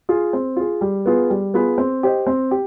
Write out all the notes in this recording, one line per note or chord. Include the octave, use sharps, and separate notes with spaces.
F4 G#4
C4
F4 G#4
G3
B3 F4 G#4 B4
G3
B3 F4 G#4 B4
C4
G4 C5 D#5
C4
G4